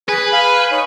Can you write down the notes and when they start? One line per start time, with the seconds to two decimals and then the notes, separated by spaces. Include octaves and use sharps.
0.09 G#4 B4
0.33 F5 G#5
0.71 D#4 C#5